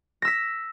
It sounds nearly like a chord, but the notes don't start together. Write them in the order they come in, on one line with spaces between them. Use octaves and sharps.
A#6 E6 B6